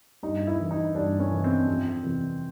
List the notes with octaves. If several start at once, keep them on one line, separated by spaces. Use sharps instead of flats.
G2 D#4
E4
E3
D#4
G2 D4
C#4
E3
C4
F2
C3 E3